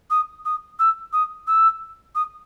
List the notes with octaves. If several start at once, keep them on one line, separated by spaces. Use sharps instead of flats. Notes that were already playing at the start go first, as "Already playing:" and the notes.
D#6
D#6
E6
D#6
E6
D#6